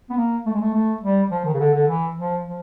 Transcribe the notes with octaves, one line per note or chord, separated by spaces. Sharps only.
B3
A#3
A3
G#3
A3
A3
G3
F3
D#3
C#3
D3
D3
E3
F3
F3